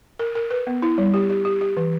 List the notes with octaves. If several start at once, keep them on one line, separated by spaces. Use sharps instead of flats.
A#4
A#4
B4
B3
E4
G3
G4
G4
G4
G4
E3